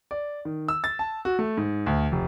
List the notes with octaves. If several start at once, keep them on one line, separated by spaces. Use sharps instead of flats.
D5
D#3
E6
A6
A5
F#4
A3
G#2
D2
F1